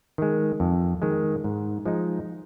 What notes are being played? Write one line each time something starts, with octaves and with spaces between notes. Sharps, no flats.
D#3 G#3
F2
D#3 G#3
G#2
F3 G#3 D#4